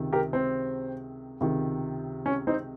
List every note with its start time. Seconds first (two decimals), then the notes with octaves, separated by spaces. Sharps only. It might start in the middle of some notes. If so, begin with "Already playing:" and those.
Already playing: C#2 C3 D#3
0.13 G4 A#4
0.33 C4
1.41 C#2 C3 D#3
2.26 C#4
2.47 C4 D#4